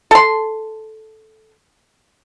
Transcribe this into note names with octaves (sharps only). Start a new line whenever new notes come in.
A4 C6